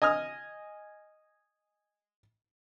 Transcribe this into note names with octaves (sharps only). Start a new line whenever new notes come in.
D#5 G#5 D#6 F6